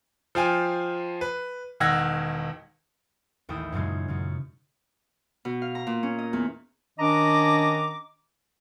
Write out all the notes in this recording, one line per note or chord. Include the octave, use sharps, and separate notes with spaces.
F3 F4 G5 G#5
B4
E1 D#3 F#5 E6 G#6 A#6
A1 D#2 E4 G5 D#6
F#2 A#2 C#3 G#3
F#2 C#3
B2
F5
A#5
A#2
C#4
D#5
E2
D#3 C#4 D4 D#5 A#5 D6